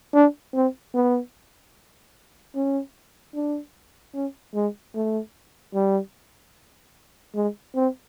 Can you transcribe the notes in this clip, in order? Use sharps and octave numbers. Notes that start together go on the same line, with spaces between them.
D4
C4
B3
C#4
D4
C#4
G#3
A3
G3
G#3
C4